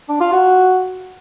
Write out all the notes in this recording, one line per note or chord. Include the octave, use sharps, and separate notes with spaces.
D4
F4
F#4